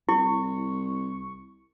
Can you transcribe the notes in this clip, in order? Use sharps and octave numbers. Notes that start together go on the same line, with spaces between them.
C2 E4 C#6